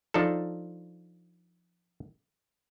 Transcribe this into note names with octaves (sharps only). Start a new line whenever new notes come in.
F3 D4 D#4 A4